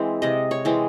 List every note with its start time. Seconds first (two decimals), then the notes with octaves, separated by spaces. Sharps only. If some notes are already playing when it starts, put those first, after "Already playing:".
Already playing: E3 G#3 C4
0.22 C3 D#5
0.51 C#5
0.65 E3 G#3 C4